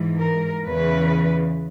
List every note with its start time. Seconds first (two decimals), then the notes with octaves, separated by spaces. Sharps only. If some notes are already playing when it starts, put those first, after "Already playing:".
Already playing: G#2 E3
0.19 A#4
0.64 E2 C#3 E3 B4